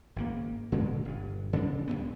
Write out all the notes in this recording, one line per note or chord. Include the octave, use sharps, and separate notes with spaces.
G#1 C#3 A#3
A#2 D3 G#3 A3
G1 G2
C#3 D4
C2 F2 A#2 B3